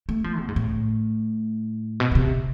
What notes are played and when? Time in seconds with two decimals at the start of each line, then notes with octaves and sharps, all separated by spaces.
0.09 A3
0.24 F3
0.40 B2
0.48 G#2
0.56 A2
2.00 B2
2.12 B2
2.15 C3